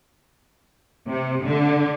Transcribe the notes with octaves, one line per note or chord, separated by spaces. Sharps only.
C3
D3